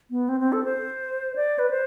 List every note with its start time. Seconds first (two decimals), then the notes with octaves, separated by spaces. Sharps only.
0.11 B3
0.29 C4
0.40 C4
0.52 A4
0.64 C5
1.36 D5
1.59 B4
1.70 C5